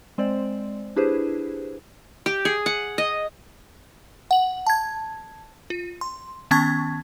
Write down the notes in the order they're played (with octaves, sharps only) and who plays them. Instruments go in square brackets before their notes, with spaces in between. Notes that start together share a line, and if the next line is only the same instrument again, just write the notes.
[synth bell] G#3 C4 C5 D5
D4 E4 G4 G#4 B4 C5
[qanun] G4
G#4
F#5
D#5
[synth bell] F#5 F#7
A5 G#6
F4
C6
D#3 B3 C#4 A5 C#6 G#6